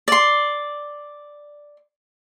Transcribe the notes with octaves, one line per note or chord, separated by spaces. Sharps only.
D5 C6